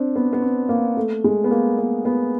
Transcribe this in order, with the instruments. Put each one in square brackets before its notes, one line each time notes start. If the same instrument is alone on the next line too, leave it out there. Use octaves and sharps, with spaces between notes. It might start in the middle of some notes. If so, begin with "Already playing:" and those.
Already playing: [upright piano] C4 D4
B3
B3
C4
A#3
A3
G#3
B3
A#3
B3
B3